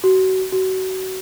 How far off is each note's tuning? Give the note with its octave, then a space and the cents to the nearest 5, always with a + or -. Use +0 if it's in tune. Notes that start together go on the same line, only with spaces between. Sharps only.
F#4 +25
F#4 +25